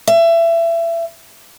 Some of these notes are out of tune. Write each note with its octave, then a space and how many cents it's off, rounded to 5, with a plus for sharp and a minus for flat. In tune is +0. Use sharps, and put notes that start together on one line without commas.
E5 +25